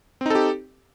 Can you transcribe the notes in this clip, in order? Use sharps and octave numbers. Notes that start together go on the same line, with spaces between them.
C4 D#4 G4 A4